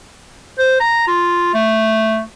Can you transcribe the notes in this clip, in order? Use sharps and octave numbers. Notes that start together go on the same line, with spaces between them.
C5
A#5
F4
A3